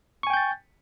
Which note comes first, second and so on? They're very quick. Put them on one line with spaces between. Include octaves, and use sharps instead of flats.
C#6 G#5 G5 G6 A6